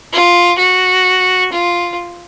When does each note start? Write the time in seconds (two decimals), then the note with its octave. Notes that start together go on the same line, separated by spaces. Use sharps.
0.13 F4
0.59 F#4
1.53 F4